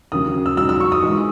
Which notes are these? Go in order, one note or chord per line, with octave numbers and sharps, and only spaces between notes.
D#2 C#3 F#3 D#6
E6
G#2 F#3 E6
E6
C#6
D#6
G#2 E3 G#3